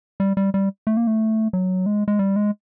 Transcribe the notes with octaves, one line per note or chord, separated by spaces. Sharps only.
G3
G3
G3
A3
A#3
A3
F#3
G#3
G#3
G3
G#3